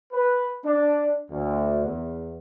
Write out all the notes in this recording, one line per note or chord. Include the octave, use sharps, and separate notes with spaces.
B4
D4
D2
E2